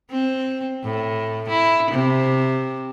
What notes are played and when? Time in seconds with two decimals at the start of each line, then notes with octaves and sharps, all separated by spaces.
0.11 C4
0.84 A2
1.49 E4
1.91 C3